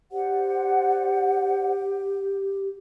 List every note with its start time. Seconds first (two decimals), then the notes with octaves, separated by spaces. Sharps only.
0.12 G4 C5 D5 F#5